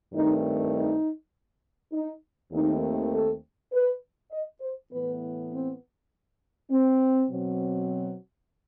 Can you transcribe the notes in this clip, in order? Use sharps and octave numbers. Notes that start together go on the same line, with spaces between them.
G2 D#3 A3 C4 D#4
D#4
D#4
D#2 D#3 A3 C4 D#4
A4
B4
D#5
C5
A2 E3 B3 B4
C4
C4
B2 F#3 C4